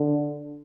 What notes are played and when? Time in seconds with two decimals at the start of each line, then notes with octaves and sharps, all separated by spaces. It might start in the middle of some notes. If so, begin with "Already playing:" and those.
Already playing: D3